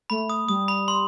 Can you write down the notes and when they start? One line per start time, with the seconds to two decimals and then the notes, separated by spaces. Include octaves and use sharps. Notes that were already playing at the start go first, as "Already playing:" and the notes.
0.10 A3 B5
0.30 D#6
0.49 G3 D#6
0.68 B5
0.88 C6